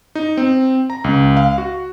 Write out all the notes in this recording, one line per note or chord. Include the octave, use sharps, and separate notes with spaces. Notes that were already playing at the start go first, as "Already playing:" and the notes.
D#4
C4
A#5
C#2
F5
F#4